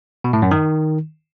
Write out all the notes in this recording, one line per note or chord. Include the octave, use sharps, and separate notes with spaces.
B2
A2
F#2
D#3